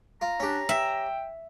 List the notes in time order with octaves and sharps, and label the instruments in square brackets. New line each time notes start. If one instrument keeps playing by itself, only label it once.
[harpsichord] F4 [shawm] A#5
[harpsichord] C#4 G4 [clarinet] D4
[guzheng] E5 [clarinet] G5